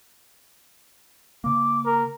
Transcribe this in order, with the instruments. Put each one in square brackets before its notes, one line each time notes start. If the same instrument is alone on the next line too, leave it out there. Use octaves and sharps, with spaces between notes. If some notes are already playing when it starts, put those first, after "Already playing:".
[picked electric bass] C#3 A#3 [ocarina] D6
[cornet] A#4